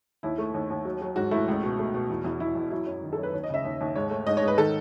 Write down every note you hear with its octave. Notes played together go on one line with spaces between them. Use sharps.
D#2 E4
A3
D#2
D#2
F#3
F#3
G#2 F#4
A3 E4
C#2
B2
A3
B2
E2
E2
E2 E4
E2
F#3 E4
F#2
D#3
A4
F#2
B4
D#2 C#5
D#5
C#3 E5
D#2
D#2
G#2 C#5
A3
G#2 D#5
C#5
G#2
B4
D#3 A4